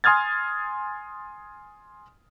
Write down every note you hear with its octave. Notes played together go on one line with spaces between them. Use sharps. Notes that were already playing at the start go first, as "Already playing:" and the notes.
G#5 C6 D#6 F6 G#6 A6